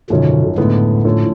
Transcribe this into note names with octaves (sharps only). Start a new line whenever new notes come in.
G#1 F#2 B2 D3 F3 G#3 C#4
D2 A2 D3 G#3 B3
D3 F3 A3 C#4